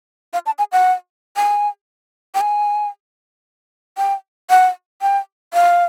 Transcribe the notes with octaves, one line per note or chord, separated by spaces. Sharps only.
F5
A5
G#5
F#5
G#5
G5
G#5
G5
F#5
G5
F5